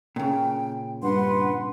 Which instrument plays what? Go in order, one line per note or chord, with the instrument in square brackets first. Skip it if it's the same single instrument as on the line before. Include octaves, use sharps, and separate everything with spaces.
[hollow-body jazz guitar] A#2 C#3 [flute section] G5
[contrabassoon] G2 [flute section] B4 F#5 C6